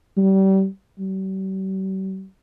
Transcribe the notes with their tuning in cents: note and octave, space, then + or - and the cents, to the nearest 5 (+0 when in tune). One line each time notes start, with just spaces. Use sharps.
G3 -30
G3 -45